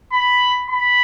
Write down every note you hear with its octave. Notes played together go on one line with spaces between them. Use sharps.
B5
B5